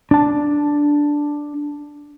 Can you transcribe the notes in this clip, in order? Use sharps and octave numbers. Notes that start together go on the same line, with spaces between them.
D4 A5